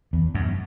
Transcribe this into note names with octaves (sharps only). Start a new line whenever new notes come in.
E2
F#2